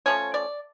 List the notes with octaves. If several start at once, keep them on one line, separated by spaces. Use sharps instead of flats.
F3 A3 C#4 C#5
D5